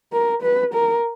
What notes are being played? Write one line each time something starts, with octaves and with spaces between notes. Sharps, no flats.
A#4
B4
A#4